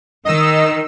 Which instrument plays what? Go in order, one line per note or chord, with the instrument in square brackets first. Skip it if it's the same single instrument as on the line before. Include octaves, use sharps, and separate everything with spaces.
[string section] D#3 [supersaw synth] D#5 E6